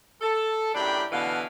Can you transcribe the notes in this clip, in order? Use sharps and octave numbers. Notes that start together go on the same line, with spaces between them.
A4
F#2 A2 D4 G4 G5 B5
B2 D3 E3 F5